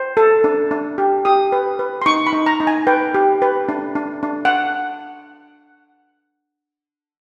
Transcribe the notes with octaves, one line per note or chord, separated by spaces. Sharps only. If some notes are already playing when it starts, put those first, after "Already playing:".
Already playing: C5
A4
D4
D4
G4
G4 D#6
B4
B4
C6
D#4 C#6
B5
D#4
A#5
D#4
G#5
B4 G5
G4
B4
D4
D4
D4
F#5